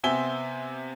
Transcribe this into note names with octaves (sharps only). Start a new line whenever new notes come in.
C3 B3 C4 E5 G#5 G7